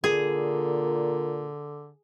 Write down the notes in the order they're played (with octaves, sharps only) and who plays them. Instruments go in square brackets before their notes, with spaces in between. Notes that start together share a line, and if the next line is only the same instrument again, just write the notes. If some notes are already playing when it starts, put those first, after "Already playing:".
[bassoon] A#2 [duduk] D3 [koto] G#4